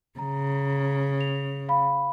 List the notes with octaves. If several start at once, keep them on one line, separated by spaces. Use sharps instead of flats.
C#3 A#5
F7
F5 B5